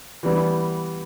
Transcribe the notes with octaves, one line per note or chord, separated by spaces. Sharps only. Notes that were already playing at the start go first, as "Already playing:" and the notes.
E3 G3 B3